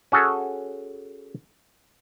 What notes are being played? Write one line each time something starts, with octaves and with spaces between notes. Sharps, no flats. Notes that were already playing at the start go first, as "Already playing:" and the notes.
C#4 F#4 G#4 A4